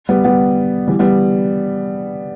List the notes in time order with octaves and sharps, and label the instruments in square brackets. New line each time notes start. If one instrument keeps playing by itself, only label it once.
[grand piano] G3 B3
G3 B3
E3 G3
G3 B3